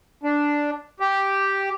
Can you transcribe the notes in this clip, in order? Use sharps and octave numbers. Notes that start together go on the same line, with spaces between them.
D4
G4